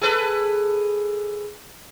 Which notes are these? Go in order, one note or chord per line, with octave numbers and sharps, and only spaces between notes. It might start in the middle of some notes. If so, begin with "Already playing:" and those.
G#4 A4 B4